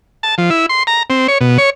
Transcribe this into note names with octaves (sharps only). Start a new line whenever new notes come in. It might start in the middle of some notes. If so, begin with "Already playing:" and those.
A5
F3
E4
C6
A#5
C4
C#5
B2
C#5